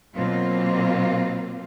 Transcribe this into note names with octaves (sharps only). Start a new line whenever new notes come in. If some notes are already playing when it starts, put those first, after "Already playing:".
B2 F#3 A#3 C4 F4